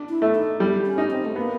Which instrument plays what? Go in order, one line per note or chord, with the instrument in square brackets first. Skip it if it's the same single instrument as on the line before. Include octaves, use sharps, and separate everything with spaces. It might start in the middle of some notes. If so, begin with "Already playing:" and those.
Already playing: [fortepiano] D4
[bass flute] E4
[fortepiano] A3
[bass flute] D#4
[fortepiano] G3
[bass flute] C#4
[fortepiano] D#4
[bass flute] C4
A3
[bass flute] A#3 [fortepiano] B3